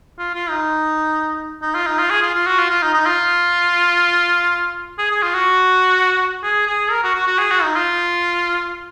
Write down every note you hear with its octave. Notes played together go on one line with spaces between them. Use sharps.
F4
F4
D#4
D#4
F4
D#4
F4
G#4
F4
F4
F#4
F4
F4
D#4
D#4
F4
G#4
G#4
F4
F#4
G#4
G#4
A#4
F#4
F#4
F#4
G#4
F#4
D#4
F4